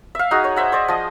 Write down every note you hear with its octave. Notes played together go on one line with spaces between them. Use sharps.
E5 F5
D#4 F#4 G#4
C#5
C5 E5 F#5
C5 D5 D#5
F3 D#5